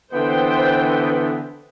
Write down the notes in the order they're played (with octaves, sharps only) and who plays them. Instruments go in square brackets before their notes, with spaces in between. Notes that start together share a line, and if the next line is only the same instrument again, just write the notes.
[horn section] D3 E3 B3 [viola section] C5 G5